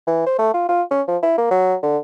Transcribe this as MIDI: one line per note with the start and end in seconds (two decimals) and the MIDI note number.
0.07 0.25 52
0.26 0.37 72
0.38 0.51 57
0.54 0.64 65
0.69 0.82 65
0.91 1.02 61
1.08 1.17 53
1.23 1.35 64
1.38 1.46 58
1.51 1.75 54
1.83 1.98 50